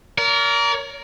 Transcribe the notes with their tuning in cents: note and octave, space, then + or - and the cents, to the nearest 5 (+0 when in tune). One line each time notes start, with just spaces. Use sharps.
A#4 +0 D5 -40